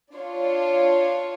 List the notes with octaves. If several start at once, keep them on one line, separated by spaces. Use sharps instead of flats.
D4 F4 C#5